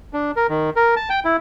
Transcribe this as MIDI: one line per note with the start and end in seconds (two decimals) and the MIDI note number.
0.13 0.31 62
0.36 0.47 70
0.49 0.70 51
0.76 0.95 70
0.96 1.09 81
1.09 1.20 79
1.25 1.36 64